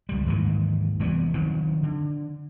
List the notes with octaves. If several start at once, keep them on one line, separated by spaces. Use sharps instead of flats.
C#2 G3
D#2 G#2 D#3 E3
F1 E3 G3 B3
D#3 F3 F#3 C4
D3